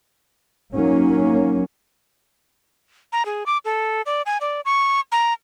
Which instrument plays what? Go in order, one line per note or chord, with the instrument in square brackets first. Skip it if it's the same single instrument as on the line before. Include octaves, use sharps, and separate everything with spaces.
[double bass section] F#3 A#3 C#4 [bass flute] D#4
[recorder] A#5
G#4
D6
A4
D5
G#5
D5
C#6
A#5